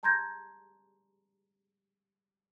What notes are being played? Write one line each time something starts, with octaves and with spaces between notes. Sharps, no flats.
A5 A#5 C6 G6 G#6 A#6